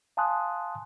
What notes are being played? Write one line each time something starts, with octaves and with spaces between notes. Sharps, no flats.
F5 G#5 A5 C6 D#6 F#6